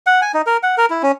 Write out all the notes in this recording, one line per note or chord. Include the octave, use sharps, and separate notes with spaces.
F#5
G#5
D#4
A#4
F#5
A#4
E4
C#4